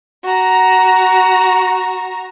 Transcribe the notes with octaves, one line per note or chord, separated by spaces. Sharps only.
F#4 A#5